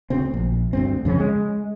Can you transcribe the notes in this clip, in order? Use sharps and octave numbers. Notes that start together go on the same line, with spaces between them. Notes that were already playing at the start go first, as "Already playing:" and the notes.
D2 C#3 C4
A#1
D2 G2 C4
F2 C#3 A#3 C#4
G#3